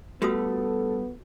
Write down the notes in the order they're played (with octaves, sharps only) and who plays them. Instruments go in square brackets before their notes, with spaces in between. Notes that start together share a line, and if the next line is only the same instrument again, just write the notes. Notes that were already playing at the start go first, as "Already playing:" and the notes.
[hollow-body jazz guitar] G2 G3 A3 [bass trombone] B3 [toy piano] F4 F#4 D#6 [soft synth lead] A4